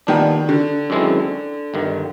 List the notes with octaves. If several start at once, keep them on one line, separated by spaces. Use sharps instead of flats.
A#1 A#2 D#3 G3 B3 D4
D3
F#2 D#3 G#3 C4 E4
G1 G2 D#3